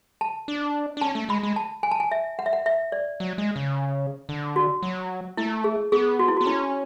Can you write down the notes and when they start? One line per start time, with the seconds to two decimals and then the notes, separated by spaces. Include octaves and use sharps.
0.21 A5
0.48 D4
0.97 D4
1.01 C#4 A5
1.15 A3
1.29 G#3 B5
1.43 G#3
1.56 A5
1.83 G#5
1.91 A5
2.00 G#5
2.11 E5
2.39 F#5
2.46 E5
2.53 F#5
2.66 E5
2.92 D5
3.20 F#3
3.38 G#3
3.56 C#3
4.29 D3
4.56 F#4
4.82 F#3
5.37 A3 E4
5.64 G#4
5.92 B3 G#4
6.19 F#4
6.28 E4
6.37 F#4
6.41 B3
6.46 C#4 E4